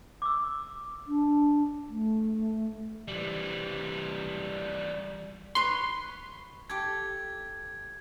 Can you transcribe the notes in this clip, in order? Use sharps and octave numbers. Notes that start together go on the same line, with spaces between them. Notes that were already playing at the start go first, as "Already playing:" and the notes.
D6 E6
D4
A3
E3 G3
B4 C#5 C6
G4 A4 G#6